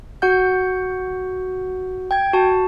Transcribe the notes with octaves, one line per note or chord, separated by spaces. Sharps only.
F#4 F#5 G6
G5 G#6
F#4 A5